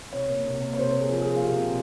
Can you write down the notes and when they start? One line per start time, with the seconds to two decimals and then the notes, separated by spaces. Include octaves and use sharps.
0.12 C3 C#5
0.29 A#3
0.44 C3
0.61 A#3
0.73 C#5
0.78 C3 C5
0.94 A#3
0.99 G#4
1.10 F3
1.22 G#4
1.27 A#3
1.36 F4
1.42 C3 G4
1.58 C3